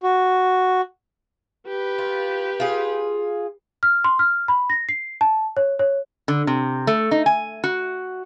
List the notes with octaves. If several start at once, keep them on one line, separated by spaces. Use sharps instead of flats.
F#4
G4 B4
F4
F4 G#4
F6
C6
F6
B5
A#6
C7
A5
C#5
C#5
D3
C3
A3
D#4
G#5
F#4